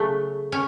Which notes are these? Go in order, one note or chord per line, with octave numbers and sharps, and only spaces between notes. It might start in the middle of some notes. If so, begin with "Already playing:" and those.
Already playing: C#3 F#3 A3
C#4